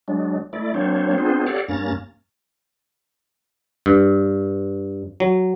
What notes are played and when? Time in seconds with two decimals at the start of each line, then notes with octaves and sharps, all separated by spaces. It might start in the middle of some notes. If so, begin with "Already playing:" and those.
0.08 F#3 G#3 D4
0.53 A3 E4 D5
0.74 F#3 A#3 C4 D4 C5 C#5
1.18 B3 C4 D4 F4 G#4 C5
1.46 G4 A4 C#5 D5 F5 F#5
1.68 G2 A#3 C#4 A#5 A6
3.86 G2
5.20 F#3